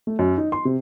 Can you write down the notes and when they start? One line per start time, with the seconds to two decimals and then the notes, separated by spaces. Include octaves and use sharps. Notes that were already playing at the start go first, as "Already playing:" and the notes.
0.07 A3
0.19 F#2
0.37 D#4
0.52 C6
0.65 C3